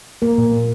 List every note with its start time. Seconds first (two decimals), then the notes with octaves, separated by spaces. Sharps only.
0.22 A#3 A#4
0.38 A#2
0.52 A#3